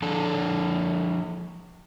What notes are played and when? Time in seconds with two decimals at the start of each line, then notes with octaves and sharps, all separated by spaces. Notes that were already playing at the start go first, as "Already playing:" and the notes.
0.02 F3 D4 A4